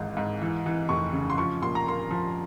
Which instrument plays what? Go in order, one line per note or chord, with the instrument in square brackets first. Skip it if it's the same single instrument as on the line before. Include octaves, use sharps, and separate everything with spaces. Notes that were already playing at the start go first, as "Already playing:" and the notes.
Already playing: [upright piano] G#1 G#2 E3
G#2
E3
E3
F1 C#6
C#3
C6
F3 C#6
A#2 C6
A#5
A#3 C6
F3